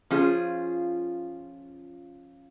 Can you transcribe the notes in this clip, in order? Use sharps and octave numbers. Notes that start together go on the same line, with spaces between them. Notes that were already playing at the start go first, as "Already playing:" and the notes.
F3 C#4 F4 G#4 C5